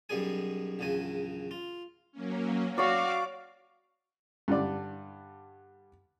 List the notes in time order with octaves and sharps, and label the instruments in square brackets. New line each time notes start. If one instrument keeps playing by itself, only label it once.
[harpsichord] B1 F#2 B2 G3 G#4 G#5
A#1 E2 C#3 F#3 G#5
F4
[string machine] F#3 A#3 C#4
[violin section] F#4 [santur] C#5 D5 [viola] F5 [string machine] D6
[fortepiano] G2 D3 D5